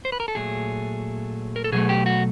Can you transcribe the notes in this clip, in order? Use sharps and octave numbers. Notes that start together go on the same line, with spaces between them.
C5
B4
A#4
A4
A#2 F#3 A3 G#4
A#4
A4
B2 F#3 A3 G#4
G4
F#4